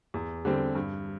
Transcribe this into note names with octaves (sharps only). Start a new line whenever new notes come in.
E2
D3 G3 C4
G2